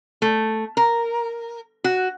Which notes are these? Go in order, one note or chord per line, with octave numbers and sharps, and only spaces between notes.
A3
A#4
F#4